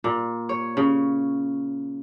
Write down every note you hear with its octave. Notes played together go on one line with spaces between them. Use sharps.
A#2
C#5
C#3